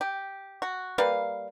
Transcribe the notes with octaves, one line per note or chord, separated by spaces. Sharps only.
G4
F#4
G3 A#3 B4 F5